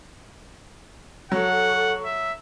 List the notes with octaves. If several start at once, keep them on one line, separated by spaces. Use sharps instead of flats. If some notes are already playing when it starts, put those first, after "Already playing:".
F#3 A4 F#5 C#6
E5